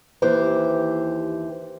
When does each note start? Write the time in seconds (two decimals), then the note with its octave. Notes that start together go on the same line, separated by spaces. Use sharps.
0.22 D#2 E3 G4 C5